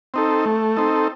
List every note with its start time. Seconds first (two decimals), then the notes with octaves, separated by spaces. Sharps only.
0.14 C4 D#4 A4
0.45 A3
0.77 C4 D#4 A4